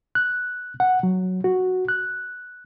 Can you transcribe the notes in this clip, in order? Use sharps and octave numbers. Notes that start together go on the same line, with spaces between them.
F#6
F#5
F#3
F#4
F#6